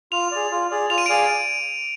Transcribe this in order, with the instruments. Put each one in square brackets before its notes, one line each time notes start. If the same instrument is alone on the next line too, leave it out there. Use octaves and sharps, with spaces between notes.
[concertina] F4 [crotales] F7
[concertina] G#4 D5
F4
G#4 D5
[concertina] F4 [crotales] F7
[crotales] D#7
D7
[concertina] G#4 D5 F5 G#5